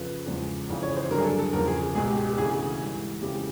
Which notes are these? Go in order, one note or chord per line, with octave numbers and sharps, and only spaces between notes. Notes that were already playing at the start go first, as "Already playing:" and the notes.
Already playing: F2 C#3 F3 B4
E2 C#3 F3 G#3
F2 C#3 E3
C#5
C5
G2 D3 F#3 A#4
G#4
A4
A4
E2 C#3 F3 A#4
G#4
C#2 B2 G#3 G#4
G4
G#4
G4
D2 C#3 E3 G#4
G#2 E3 G3
F2 C#3 E3 G#3 G4